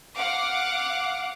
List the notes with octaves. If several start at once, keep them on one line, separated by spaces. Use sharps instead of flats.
F5 F#5 D6